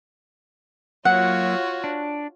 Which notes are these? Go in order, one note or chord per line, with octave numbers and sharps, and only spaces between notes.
F#3 A#3 F4 F#4 C#5 F#5
D4